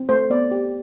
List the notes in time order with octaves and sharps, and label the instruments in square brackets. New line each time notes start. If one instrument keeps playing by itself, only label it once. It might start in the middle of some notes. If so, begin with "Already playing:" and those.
Already playing: [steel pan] C4
A3 C5
B3 D5
G4